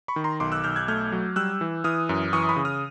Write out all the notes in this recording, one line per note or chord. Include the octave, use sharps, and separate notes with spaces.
B5 C#6
D#3
A#5 C6
B1 C6 D6
E6 F#6
B1 F6 G6
F#6 G#6
A3 F6 G6
F#3
G3 E6 F#6
E3
E3 D#6 F6
F#2
E3 C#6 D#6
B5 C#6
C#3
D#6 F6